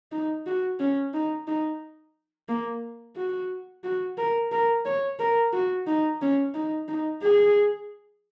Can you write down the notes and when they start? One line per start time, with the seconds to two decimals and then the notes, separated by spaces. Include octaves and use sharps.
0.12 D#4
0.46 F#4
0.80 C#4
1.14 D#4
1.48 D#4
2.49 A#3
3.16 F#4
3.84 F#4
4.18 A#4
4.52 A#4
4.85 C#5
5.19 A#4
5.53 F#4
5.87 D#4
6.21 C#4
6.54 D#4
6.88 D#4
7.22 G#4